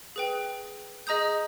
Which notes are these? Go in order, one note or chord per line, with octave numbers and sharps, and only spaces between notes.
G#4 B4 G5
G#4 D#5 A#5 D#6 G6